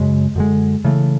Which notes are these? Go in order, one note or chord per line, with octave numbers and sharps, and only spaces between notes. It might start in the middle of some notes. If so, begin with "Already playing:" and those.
Already playing: F#2 C#3 G#3
F#2 D3 G#3
C#3 E3 A3